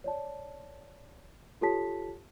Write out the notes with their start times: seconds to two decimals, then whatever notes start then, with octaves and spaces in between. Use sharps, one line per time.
0.04 C#5 D5 A5
1.61 F4 G4 A4 C#5 A5 B6